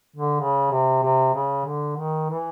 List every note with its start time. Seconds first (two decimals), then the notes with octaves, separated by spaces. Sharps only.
0.16 D3
0.40 C#3
0.71 C3
1.03 C3
1.35 C#3
1.66 D3
1.97 D#3
2.30 E3